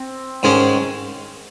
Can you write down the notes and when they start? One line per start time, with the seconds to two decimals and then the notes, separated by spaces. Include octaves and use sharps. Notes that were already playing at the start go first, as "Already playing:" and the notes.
Already playing: C4
0.43 G#2 D#3 G#3 C#4